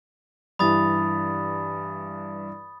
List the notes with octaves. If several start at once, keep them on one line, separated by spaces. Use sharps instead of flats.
G2 E3 B5 D#6 A6